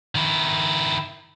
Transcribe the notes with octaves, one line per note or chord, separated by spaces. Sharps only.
D#3 E4